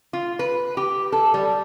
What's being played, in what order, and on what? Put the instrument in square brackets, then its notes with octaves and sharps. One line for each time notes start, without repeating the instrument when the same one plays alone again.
[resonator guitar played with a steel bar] F4
B4
G4
A4
G3